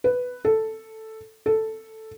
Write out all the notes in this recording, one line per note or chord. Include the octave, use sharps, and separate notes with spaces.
B4
A4
A4